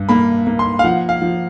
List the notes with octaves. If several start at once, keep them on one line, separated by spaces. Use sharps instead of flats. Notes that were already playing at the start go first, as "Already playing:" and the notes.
Already playing: G2
A#3 B5
A#3
C6
F5
F3 F#5
F5
F3